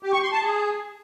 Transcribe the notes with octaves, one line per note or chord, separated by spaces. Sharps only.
G4
C#6
C6
A5
G#4